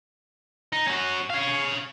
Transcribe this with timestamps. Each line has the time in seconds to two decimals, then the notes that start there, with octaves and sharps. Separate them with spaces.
0.72 D#4
0.87 C#4 F#4
1.30 C#5 F5